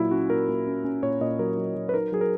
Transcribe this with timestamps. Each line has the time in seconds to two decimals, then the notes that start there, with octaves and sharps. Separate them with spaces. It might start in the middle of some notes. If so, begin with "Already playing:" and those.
Already playing: A#2 F#3 E4
0.11 C#4 F#4
0.30 A#2 A#4
0.49 A#2
0.67 C#4
0.84 C#4
1.03 A#2 C#5
1.21 A#2 D#5
1.39 F#3 A#4
1.57 F#3
1.76 F#3
1.89 B4
1.94 D#4 A#4
2.12 F#3 G#4
2.21 A#4